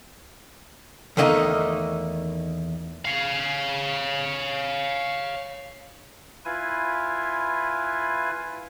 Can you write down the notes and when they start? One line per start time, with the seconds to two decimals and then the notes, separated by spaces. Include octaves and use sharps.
1.17 E2 D#3 A3 A#3 D4 D#4
3.05 C#5 F5
6.45 E4 F4 B4 G#5